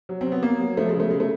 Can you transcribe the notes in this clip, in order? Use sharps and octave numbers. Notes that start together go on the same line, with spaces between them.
F#3
C4
F#3
B3
F#3 A#3
F#3
F3 A3
C#3 G#3
A3
C#3 G#3
A3